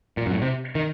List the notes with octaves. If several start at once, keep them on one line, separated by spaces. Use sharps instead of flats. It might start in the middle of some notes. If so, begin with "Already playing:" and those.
A#2
F#2
A2
C3
D#3